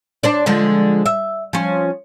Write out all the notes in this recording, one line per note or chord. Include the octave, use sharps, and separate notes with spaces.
D4 C5 D5
D3 F3 G#3
E5
F3 C#4